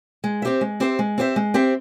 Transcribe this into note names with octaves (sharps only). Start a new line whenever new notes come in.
G#3
C4 G4 C5 E5
G#3
C4 G4 C5 E5
G#3
C4 G4 C5 E5
G#3
C4 G4 C5 E5